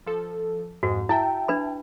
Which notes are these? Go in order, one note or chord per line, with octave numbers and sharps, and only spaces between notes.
F3 A4
F2 G#2 F#4
E4 E5 G5 A5
D4 B4 B5